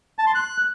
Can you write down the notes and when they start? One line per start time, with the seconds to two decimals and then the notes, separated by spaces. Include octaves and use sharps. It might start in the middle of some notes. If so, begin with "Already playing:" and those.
0.19 A5
0.27 C6
0.35 F#6